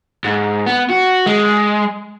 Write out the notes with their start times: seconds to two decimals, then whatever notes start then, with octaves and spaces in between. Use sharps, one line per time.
0.24 G#2
0.66 B3
0.90 F#4
1.26 G#3